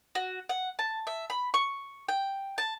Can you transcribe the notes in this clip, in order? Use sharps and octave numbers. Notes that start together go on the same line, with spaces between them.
F#4
F#5
A5
E5
B5
C#6
G5
A5